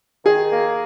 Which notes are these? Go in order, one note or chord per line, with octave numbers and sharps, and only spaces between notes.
D#3 G#4
A#3